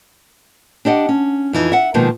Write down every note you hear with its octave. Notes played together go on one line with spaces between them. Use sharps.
D4 G4 D#5 F#5
C#4
F2 E3 D#4
E5 F#5
B2 D#3 F3 G#3 A#3